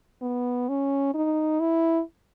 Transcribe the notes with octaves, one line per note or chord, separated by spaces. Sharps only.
B3
C#4
D#4
E4